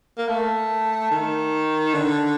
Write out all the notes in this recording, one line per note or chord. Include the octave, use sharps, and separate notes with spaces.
A#3
A3
D#3
D3